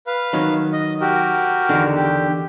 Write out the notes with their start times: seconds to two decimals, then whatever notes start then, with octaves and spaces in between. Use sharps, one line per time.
0.07 B4 F5
0.33 D#3 F#3
0.73 D#5
1.01 F#4 G4 A#4
1.69 E2 D3 D#3
1.95 G4